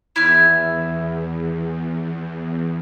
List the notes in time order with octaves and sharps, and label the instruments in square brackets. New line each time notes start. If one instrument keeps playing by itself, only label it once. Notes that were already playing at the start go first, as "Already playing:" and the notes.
[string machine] E2 [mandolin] E4 E5 F6